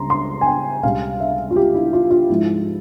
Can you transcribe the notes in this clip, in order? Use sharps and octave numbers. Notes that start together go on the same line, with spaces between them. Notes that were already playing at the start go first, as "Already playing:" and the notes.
Already playing: C#2 C#3 G3 A#5 C6
C6
G#5
G5
C#2 C3 G3 F5
E5
F4
G4
E4
F4
F4
G#2 F3 G#3 E4